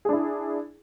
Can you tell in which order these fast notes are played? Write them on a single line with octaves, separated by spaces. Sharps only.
G#4 D4 E4